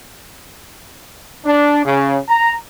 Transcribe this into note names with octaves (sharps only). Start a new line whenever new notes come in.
D4
C#3
A#5